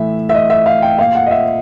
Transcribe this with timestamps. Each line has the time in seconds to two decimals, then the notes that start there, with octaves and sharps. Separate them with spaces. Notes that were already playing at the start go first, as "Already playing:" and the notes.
Already playing: A2 E3 E5
0.29 E5
0.34 D#5
0.50 E5
0.66 F5
0.82 G5
0.99 A#2 F5
1.15 F#5
1.26 D#5
1.31 E5